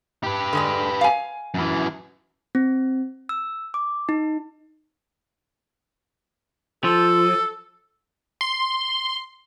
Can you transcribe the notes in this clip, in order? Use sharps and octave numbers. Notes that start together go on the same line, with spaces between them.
G4 B4
D3 G#3 D4
F5 G#5
F#2 E3
C4
E6
D6
D#4
F3 A4
C6